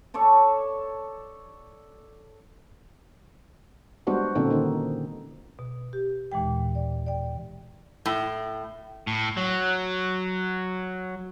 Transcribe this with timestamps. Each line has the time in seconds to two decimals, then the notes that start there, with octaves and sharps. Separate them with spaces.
0.14 A4 C#5 D5 A5
4.07 G3 G#3 B3 D4 F#4 C5
4.35 A#2 D3 C4 C#4 D#4 A4
4.50 D3 D#3 D#4
5.59 B2
5.93 G4
6.32 D#2 A#2 E3 G#3 G5
6.75 D5
7.06 D5 G5
8.06 A2
9.07 A2
9.37 F#3